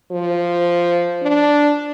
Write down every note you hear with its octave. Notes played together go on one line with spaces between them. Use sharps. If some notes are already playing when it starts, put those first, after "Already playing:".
F3
D4